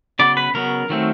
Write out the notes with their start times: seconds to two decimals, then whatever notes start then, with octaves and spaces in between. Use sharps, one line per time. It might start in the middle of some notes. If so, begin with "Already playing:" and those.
0.19 C#3 F#3 B3 D5
0.37 B4
0.54 C#3 F#3 B3 A#4
0.89 D#3 F#3 A3 C4